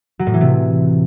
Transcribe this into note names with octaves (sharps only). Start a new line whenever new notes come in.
F#3
A2
E3
C3